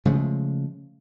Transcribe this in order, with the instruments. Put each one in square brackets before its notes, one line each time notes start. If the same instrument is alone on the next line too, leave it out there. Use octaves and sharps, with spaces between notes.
[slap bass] C#3 F3 G#3 A3